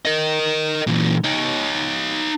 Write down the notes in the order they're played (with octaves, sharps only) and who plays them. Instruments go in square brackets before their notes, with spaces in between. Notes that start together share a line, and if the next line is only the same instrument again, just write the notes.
[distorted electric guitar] A#4 D#5
A#2 E3
D#4 C#5